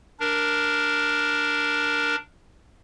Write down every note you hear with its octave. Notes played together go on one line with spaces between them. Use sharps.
D4 A#4